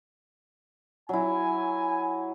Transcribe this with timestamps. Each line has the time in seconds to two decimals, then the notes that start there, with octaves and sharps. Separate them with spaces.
1.09 F#3 E4 G#5